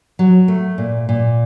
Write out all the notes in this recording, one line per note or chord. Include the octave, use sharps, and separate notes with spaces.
F#3
A3
A#2
A#2